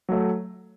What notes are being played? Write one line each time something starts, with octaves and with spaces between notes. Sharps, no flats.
F#3 A3